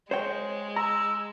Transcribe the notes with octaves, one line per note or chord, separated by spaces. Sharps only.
G#3 C5 C#5 G5
A#5 E6